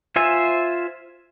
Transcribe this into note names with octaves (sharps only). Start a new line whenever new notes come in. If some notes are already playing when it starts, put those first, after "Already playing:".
F4 C5 E5 G#5